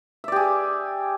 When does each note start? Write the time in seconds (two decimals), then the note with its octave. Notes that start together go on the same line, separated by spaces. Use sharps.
0.24 E5
0.28 D5
0.32 G4
0.36 G#4